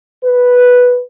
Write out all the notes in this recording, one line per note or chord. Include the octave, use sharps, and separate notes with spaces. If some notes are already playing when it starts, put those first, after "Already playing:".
B4